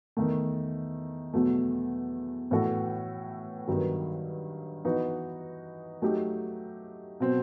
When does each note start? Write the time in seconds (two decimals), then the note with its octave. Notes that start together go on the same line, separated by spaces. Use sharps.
0.17 E2 D#3 A3
1.34 E2 B2 F#3 A3
2.51 A2 E3 B3 F#4 A4
3.68 G2 D#3 F#3 B3
4.85 E3 B3 D#4 F#4
6.02 F#3 A3 D#4 G4
7.20 B2 F#3 C4